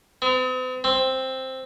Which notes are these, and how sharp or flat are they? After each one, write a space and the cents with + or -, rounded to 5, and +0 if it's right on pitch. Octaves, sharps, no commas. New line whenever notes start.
C4 -45
C4 +5